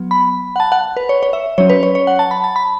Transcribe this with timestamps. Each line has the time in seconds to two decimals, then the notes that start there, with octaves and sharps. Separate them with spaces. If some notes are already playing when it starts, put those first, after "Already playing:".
Already playing: F#3 B3
0.11 B5
0.56 F#5
0.60 A5
0.72 F#5
0.97 B4
1.09 C#5
1.23 C#5
1.33 E5
1.58 F#3 C#4 C#5
1.70 B4
1.83 C#5
1.95 C#5
2.07 F#5
2.19 A5
2.31 B5
2.44 A5
2.56 B5